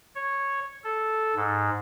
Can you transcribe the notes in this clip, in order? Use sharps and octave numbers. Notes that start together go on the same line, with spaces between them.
C#5
A4
G#2